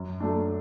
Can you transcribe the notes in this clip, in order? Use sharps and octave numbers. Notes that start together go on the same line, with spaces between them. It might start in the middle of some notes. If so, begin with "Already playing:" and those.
Already playing: F#2
F#3 A3 D4